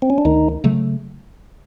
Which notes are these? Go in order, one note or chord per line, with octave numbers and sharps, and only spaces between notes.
C4
C#4
D4
D2 D#3 D#4
C#3 F#3 A3